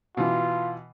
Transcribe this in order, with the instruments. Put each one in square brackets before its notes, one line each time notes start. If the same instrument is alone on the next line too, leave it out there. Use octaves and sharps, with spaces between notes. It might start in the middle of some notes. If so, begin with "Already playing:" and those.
[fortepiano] B2 E3 [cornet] F4